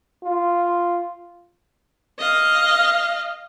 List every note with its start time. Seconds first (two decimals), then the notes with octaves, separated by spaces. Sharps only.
0.24 F4
2.19 D#5 F5